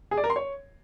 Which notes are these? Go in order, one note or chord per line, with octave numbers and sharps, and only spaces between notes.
G#4
D5
A#4
C6
C#5